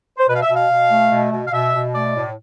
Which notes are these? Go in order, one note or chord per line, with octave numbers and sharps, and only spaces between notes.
C5
B2 B4
F5
E5
B2
F5
B2
A3
B2
B2
F5
B2 E5
B2
A3 D5
A2